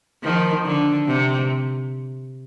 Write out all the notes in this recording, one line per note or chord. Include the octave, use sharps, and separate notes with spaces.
D#3 F3
D3
C3